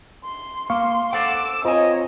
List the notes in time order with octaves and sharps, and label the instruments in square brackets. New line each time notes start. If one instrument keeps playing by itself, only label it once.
[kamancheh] C6
[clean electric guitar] A#3 [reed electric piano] F5 C#6 [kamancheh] C6
[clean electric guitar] A4 C5 F#5 [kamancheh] D6 E6
[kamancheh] C4 C#5 [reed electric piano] F4 C5 [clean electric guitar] A#4 G#5 [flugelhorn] D#5